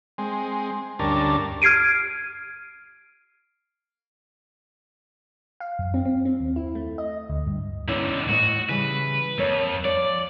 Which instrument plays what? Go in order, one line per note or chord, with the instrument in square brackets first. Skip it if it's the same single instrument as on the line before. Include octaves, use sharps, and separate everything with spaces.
[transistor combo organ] G#3 C4
D2 G2 C#4 D4 A#4 A5
[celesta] F6 G#6 C7 D7 D#7
[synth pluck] F5
F#2
C4
C4
C4
D#2
E4
A3
D#5
D2
G2
[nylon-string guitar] E2 C#4 E4 [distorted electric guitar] G#2 D3
[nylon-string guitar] A2 E4 D#5 [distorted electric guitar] F#4
[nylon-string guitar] C#3 E3 G3 [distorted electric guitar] B4
[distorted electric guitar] F2 [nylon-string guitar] A#3 C#5
[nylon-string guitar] F3 C#5 [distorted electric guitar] D5